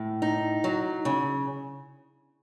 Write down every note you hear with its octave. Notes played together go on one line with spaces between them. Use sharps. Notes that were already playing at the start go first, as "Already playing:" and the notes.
Already playing: A2
D#4
F#3
C#3